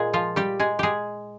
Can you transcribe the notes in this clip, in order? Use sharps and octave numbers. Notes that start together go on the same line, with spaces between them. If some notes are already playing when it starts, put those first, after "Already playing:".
Already playing: A#2 G#3 G#4
F3 F4
G3 G4
G#3 G#4
G#3 G4 G#4